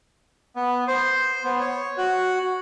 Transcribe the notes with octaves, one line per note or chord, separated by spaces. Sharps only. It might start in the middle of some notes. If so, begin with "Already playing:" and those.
B3
C5
B3
C#5
F#4